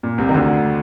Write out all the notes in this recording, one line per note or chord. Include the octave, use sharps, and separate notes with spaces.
A#2
C2 C3
D#3
D2 D3